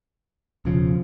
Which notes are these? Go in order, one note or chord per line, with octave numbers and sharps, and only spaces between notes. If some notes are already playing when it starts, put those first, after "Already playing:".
E1 E2 C#3 F3